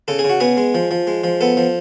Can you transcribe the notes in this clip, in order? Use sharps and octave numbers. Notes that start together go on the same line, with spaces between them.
C#3 A4
G#4
C#3
F#4
B3 G#4
G#3
F3
F3
G#3
F3
B3 A4
F3